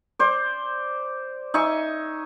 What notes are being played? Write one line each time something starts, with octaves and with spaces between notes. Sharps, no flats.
C5 D5
D#4 E5 G#5 C#6